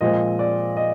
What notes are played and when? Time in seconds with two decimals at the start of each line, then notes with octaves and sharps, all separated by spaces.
0.01 A#2 F3 G#3 C4 D#5
0.39 D5
0.77 D#5